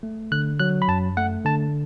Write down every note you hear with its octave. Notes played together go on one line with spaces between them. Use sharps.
A3
D3 F#6
F#3 F#6
B5
F#2 A5
A3 F#5
D3 A5